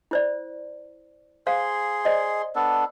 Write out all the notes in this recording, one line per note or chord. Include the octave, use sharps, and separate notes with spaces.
E4 C5 D5
G#4 C5 F5 C6
C5 D5 D#5
B3 D4 A4